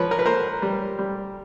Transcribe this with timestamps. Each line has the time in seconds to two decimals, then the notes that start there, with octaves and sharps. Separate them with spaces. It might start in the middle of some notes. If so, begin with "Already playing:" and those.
Already playing: F3 B4 C#5
0.11 A#4
0.19 B4
0.26 A#3 A#4 C5
0.62 G3
0.99 G3